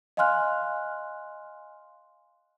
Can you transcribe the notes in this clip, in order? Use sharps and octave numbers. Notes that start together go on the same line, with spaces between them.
D#5 F5 G#5 C6 F6 F#6